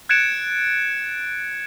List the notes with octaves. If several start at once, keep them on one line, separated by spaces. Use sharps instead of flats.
F#6 G#6 A6 C#7 D7 E7